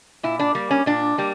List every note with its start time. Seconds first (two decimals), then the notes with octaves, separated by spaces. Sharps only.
0.23 A#2 E4
0.39 D4
0.55 G3 A#3
0.71 C#4
0.86 A#2 D4
1.18 G3 A#3